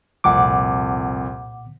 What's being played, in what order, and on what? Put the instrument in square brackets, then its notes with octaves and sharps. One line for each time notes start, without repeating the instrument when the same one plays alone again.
[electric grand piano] C2 F2 [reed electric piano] A#2 F#5 D6